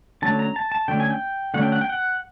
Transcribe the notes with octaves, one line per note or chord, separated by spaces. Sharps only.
D3 F#3 A3 C#4 A5
A#5
A5
A5
D3 F#3 A3 C#4 G5
G#5
G5
D3 F#3 A3 C#4 F#5
G5
F#5
G5
F#5